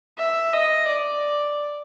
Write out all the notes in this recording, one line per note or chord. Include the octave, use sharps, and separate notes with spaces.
E5
D#5
D5